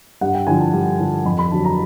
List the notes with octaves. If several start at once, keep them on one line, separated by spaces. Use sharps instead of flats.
G2 F#5
G5
D3 F3 G#5
A5
G2
D3 F3
F2 B5
B5
D3 F#3 A5
A#5